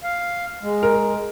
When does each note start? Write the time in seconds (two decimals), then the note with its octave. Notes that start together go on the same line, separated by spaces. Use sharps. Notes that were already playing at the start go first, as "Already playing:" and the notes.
0.03 F5
0.62 G#3
0.83 A#4